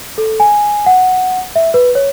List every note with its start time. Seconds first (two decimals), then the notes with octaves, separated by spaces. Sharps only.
0.18 A4
0.40 G#5
0.86 F#5
1.56 E5
1.74 B4
1.95 C#5